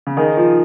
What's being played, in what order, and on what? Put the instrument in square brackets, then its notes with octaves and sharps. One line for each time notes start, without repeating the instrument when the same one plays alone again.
[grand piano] C#3
[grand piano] D#3 [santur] D#4 G#4 D#5
[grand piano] F3